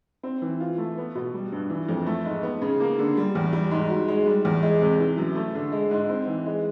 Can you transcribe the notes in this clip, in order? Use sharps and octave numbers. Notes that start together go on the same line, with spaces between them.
C4
E3
F4
A3
B3
B2
G3
G2
E3
F2
A3
G#2
B3
C#3
A#3
D3
G3
E2
G3
G#2
F#4
G#3
G3
E2
G#3
C3
E3
F#2
A3
D3
G#3
G#2
C4
E3
G#3